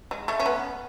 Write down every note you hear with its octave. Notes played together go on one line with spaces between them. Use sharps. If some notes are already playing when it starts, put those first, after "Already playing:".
G#3
A3
C#4
B3